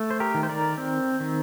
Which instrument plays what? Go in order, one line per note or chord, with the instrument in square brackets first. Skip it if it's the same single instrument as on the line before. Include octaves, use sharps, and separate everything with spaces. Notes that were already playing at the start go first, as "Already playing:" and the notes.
Already playing: [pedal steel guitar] A3
C5
G4 A#4
D#3
C5
A#4 D5
C4
D#3